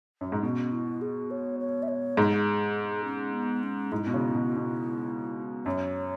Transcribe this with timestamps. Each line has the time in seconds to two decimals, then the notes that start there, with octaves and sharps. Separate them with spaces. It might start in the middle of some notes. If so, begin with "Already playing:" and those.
0.21 F#2
0.32 G#2
0.43 B2 C#4
0.72 E4
1.02 G#4
1.31 C#5
1.60 C#5
1.83 E5
1.88 C#5
2.17 G#2 G#4
3.05 C#4
3.33 B3
3.63 C#4
3.92 G#2 E4
4.07 B2
4.14 C#3
4.35 B2
4.57 B2
5.66 F#2 C#5